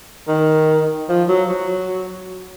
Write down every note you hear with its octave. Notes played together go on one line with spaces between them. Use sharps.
D#3
F3
F#3
F#3